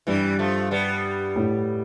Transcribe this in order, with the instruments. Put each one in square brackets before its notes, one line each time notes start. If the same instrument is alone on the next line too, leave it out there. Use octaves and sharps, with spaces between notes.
[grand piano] G2 [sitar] E3 G3
[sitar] F3 A3
G3 B3
[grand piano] A2